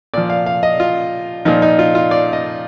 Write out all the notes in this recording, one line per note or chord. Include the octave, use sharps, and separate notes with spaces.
A#2 F3 D5
F5
F5
D#5
F4
A#2 F3 D#4
D#4
F4
F4
D5
D#5